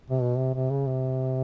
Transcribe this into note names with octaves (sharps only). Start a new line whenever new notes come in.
C3
B2
C3
C3
C#3
C3